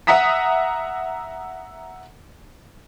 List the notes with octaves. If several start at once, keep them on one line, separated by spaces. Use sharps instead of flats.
E5 F#5 A#5 D#6 B6